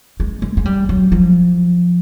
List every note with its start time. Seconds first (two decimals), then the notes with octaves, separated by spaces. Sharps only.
0.20 G#3
0.42 G#3
0.57 G#3
0.66 G3
0.89 F#3
1.12 F3